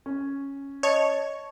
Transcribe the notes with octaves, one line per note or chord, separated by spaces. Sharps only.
C#4
C#5 D#5 A5 C#6